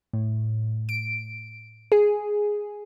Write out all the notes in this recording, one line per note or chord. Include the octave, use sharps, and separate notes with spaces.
A2
D7
G#4